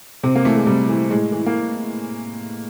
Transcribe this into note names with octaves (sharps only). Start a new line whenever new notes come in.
C3 C4
A#3
E3 A3
G#3
C3 G3
E3
A2 G#3
E3
A#3